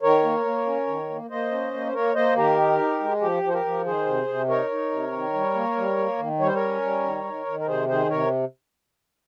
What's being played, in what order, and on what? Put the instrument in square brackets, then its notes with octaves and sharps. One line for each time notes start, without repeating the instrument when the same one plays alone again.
[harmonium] D#3 A#4 C#5
A#3
A#3
C#4
D#3
A#3
A#3 C5 D#5
C#4
A#3
C5
A#3 A#4 C#5
A#3 C5 D#5
D#3 G4 A#4
D#4
D#4
G#3
F3 G4
F3
C5
G4 A#4
F3
D#3 G#4 C5
C3
C3
D#4 A#4 C#5
D#4
C3
D#3
G3
A#3
G3
A#3
D#3
G3 C#5
C5
A#4 C#5
C#4
G3
D#3
D#3
D#3
A#4
C3 G#4 C5
D#3 G#4 C5
C3 A#4 C#5